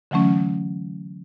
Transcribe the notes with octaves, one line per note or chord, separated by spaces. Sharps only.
D3 E3 F#3 A3 C#4